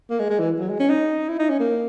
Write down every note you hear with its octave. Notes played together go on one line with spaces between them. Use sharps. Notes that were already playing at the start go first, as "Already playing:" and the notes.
A#3
G#3
G#3
E3
F#3
G#3
C#4
D#4
E4
D#4
C#4
A#3